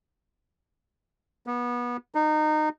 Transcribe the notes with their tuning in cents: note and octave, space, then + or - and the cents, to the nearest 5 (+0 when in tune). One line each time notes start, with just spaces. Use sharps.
B3 -25
D#4 -25